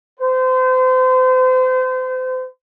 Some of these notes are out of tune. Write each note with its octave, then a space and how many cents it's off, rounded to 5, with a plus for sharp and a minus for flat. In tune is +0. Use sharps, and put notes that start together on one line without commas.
C5 -35